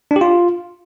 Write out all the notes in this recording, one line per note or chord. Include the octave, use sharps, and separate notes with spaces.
D4
G4
F4